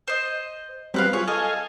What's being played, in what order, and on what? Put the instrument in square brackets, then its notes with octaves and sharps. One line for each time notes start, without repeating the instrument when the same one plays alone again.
[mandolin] C5 D#5
[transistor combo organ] F#3 G3 C4 [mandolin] B3 B4 F5
[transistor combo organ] F4 G#4 [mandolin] C#5
[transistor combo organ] A4 F5 G#5 [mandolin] D#5